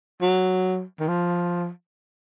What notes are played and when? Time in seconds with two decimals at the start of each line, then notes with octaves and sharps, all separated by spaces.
0.22 F#3
1.00 D#3
1.08 F3